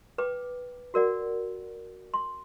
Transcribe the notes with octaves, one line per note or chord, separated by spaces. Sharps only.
B4 G5 D6
F#4 A#4 D5 F#5
C6